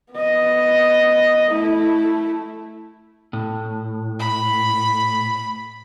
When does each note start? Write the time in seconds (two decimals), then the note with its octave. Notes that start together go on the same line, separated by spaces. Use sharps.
0.13 B3 D#5
1.50 A3 E4
3.33 A2
4.19 B5